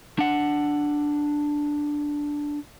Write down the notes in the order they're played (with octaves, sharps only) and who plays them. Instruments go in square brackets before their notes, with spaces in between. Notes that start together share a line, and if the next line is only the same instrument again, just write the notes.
[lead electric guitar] D4 F#5